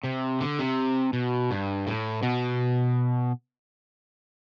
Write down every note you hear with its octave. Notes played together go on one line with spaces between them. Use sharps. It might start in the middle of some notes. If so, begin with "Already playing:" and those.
C3
D3
C3
B2
G2
A2
B2